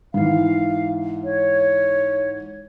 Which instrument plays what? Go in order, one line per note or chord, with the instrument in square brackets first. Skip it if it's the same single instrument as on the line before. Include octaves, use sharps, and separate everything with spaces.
[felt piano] G#2 E3 [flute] F5
[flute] C#5